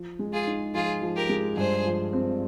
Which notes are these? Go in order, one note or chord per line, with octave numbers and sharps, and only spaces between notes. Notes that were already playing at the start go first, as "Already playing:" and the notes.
Already playing: F3
G#3
F4 G#4
D#4
F3 F4 G#4
F3
G4 A#4
G#3
G2 G#4 C5
F3
C4